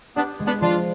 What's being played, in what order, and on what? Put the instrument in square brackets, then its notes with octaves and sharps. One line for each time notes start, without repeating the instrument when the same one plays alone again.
[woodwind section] B3 D4 [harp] G4
[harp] G#3
[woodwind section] B3 D4
[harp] F3 [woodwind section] D4 F4